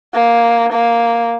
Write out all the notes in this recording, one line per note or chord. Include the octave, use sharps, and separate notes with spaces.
A#3
A#3